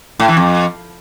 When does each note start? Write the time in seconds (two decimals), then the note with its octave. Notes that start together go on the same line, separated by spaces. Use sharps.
0.20 A2
0.28 E3
0.37 F2